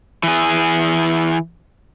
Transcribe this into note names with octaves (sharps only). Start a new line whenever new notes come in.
E3 G#4